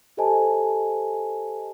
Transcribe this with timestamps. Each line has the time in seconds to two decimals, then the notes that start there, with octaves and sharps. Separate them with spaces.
0.17 G4 A4 C5 D#5 G#5 A5